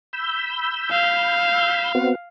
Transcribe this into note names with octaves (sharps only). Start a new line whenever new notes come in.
B5 E6 G6
F5
B3 C4 F#4